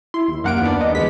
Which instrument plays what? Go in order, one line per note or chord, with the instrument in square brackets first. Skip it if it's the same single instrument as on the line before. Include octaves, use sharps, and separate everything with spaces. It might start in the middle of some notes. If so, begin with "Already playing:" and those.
[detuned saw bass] E4 [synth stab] C6
[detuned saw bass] D#2
[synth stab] F#2 F#5 D7 [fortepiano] A#3 F5
[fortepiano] B3 D4
[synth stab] D#5
[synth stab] E2 B6 [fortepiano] G#3 B3